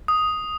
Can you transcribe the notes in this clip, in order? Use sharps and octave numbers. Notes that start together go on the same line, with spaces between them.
D#6